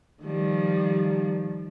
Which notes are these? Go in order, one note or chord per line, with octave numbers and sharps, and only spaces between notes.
D#3 F3 G3